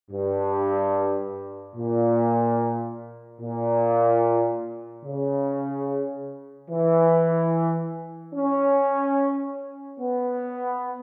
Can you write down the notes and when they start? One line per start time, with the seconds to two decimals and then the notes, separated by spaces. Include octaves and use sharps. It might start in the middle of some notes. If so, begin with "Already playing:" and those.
0.11 G2
1.76 A#2
3.41 A#2
5.06 C#3
6.71 E3
8.35 C#4
10.00 B3